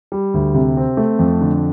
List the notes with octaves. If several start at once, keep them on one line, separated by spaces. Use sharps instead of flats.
G3
D2
C3
C4
A3
F2
D3